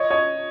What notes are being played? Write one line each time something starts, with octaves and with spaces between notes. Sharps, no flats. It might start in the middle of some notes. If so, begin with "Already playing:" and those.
Already playing: C#5 D#5
C#5 D#5